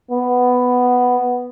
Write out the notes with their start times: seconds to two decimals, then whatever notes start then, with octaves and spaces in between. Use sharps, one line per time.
0.11 B3